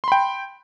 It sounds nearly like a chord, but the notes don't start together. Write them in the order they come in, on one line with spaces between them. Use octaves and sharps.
C6 B5 G5